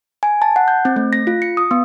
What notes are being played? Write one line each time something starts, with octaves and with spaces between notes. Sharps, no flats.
G#5
A5
F#5
G6
C4
A3
A#6
F4
C#7
D#6
B3